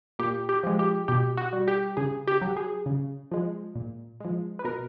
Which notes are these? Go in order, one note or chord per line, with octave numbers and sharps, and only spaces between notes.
A#2 G4
G4
F3 G#3
G4
B2 G4
F#4
G3
G4
C#3 G#4
G4
F#3
G#4
C#3
F3 G#3
A#2
F3 G#3
B4
B2 A#4